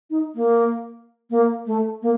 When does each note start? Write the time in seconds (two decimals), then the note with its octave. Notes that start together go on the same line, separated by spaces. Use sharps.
0.10 D#4
0.35 A#3
1.30 A#3
1.66 A3
2.02 A#3